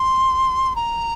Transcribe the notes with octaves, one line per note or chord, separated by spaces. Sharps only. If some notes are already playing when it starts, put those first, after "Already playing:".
Already playing: C6
A#5